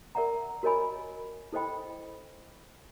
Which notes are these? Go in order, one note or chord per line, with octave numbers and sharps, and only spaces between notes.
A#4 D5 E5 F#5 A#5
F#4 A#4 C#5 D#5 G#5 B5
E4 A4 C5 D#5 G5 B5